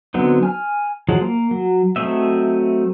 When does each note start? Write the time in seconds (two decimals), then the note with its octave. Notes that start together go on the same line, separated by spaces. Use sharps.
0.14 D3 F#3 B3 C4 D#4
0.43 G#5 F6
1.09 F3 F#3 G#3
1.21 A#3
1.51 F#3
1.96 F#3 A3 C4 D#5 E5